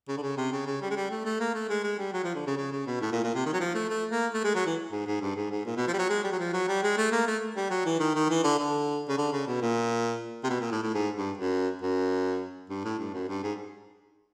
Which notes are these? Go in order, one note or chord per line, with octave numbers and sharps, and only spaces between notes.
C#3
D3
C#3
C3
C#3
C#3
G3
G#3
G3
A3
A3
A#3
A3
G#3
G#3
G3
F#3
F3
D3
C#3
C#3
C#3
B2
A2
A#2
A#2
C3
D#3
F#3
F3
A3
A3
A#3
A3
G#3
F#3
E3
G#2
G#2
G2
G#2
G#2
A#2
B2
F3
G3
F#3
G#3
G3
F#3
F3
F#3
G3
G#3
A3
A#3
A3
G3
F#3
E3
D#3
D#3
E3
D3
D3
C#3
D3
C#3
B2
A#2
C3
B2
A#2
A2
A2
G#2
G2
F#2
F#2
G2
A2
G2
F#2
G2
G#2